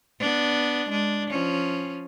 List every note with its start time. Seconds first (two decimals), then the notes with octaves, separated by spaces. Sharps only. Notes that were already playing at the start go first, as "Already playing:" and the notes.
0.19 B3 D4
0.89 G#3 D4
1.30 F3 C#4